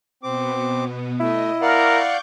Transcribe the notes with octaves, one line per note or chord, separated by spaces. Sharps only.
B2 B3 C4 D6
A3 E4 D#5
A#4 D5 F5 F#5 C#6 D6 G6